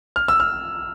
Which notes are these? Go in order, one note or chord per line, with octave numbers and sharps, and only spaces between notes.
F6
E6
F6